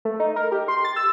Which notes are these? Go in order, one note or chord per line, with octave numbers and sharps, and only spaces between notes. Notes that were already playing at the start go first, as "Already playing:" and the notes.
A3
D#4
A#4
G4
C6
A6
E6